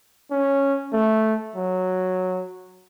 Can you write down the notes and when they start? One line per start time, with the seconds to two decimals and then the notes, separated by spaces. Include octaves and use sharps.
0.31 C#4
0.93 A3
1.56 F#3